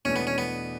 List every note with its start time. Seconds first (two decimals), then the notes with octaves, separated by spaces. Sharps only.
0.05 E2 B2 A3 C#4 D4
0.16 B3
0.27 C#4
0.38 B3